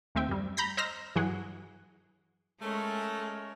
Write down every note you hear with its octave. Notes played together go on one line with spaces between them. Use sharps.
D#2 A3 C4 E5 G5
F#2 G3
A#5 B5 G6 A#6
C5 D#5 A#5 E6 F6 A#6
G2 E3 F#3 G#4 F#5
G#3 A3 C#4 A#4